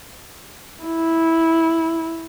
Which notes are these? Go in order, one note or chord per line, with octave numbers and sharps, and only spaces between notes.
E4